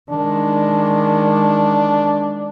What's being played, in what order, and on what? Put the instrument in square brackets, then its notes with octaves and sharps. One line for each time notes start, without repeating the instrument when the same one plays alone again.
[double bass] D#3 G#3 [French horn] D4